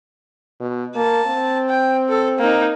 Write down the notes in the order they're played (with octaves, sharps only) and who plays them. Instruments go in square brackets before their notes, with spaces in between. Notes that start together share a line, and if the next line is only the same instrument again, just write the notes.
[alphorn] B2
[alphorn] A#3 [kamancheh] A5
[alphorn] C4
[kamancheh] G5
A4
A#3 D#4